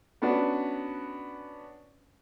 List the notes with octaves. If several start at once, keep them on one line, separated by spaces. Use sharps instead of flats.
B3 C#4 D4 F#4 B4